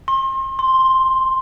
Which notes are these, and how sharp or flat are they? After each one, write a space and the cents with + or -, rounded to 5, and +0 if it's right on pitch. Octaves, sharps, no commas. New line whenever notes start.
C6 +35
C6 +5